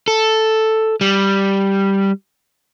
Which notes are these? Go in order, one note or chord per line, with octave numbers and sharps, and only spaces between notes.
A4
G3